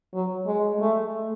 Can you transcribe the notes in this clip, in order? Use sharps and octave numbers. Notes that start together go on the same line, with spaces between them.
F#3
G#3
A3